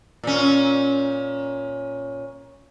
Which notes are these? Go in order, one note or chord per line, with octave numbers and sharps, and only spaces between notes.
A#2 C#4